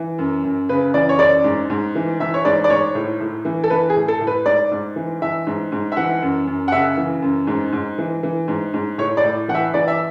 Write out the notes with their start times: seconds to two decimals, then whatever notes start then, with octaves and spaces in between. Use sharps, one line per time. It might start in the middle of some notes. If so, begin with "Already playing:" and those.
Already playing: E3
0.18 F#2
0.44 F#2
0.69 C#3 B4
0.94 E3 D5
1.09 C#5
1.19 F#2 D5
1.44 G#2
1.70 G#2
1.95 E3
2.20 E3 E5
2.34 C#5
2.45 G#2 D5
2.64 D5
2.70 G#2 C#5
2.95 A2
3.20 A2
3.45 E3
3.64 A4
3.70 E3 B4
3.90 G#4
3.96 A2
4.08 A4
4.21 A2
4.27 B4
4.46 G#2 D5
4.71 G#2
4.96 E3
5.22 E3 E5
5.47 G#2
5.72 G#2
5.92 E5
5.97 E3 F#5
6.22 F#2
6.47 F#2
6.68 F#5
6.72 C#3 E5
6.97 E3
7.22 F#2
7.47 G#2
7.73 G#2
7.98 E3
8.23 E3
8.48 G#2
8.74 G#2
8.98 A2 C#5
9.17 D5
9.24 A2
9.48 E3 F#5
9.55 E5
9.74 E3 D5
9.88 E5